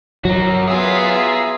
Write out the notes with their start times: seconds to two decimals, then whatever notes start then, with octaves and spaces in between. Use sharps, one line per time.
0.25 F#3 F#4 A#4
0.68 B3 F4 G#4 E5 G#5 A#5 E6